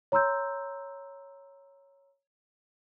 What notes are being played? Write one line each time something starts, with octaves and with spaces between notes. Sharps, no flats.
C#5 A#5 C6 E6 G6